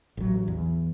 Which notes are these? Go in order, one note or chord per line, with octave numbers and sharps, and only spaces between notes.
A1 F#3
E2